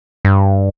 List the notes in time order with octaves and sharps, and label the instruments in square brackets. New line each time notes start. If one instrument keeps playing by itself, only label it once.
[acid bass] G2